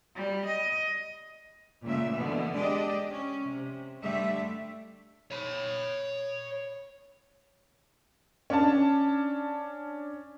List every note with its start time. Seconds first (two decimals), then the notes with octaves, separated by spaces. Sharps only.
0.16 G3
0.45 D#5
1.84 A#2 C#3 G#3 A3 E5
2.13 B2 D3 E3 A#3 B3
2.54 G#3 D4 G4 D5 D#5
3.12 C#4
3.45 C3
4.01 D3 G3 A3 E5
5.31 C#5 B5
8.50 C#4 D4 A5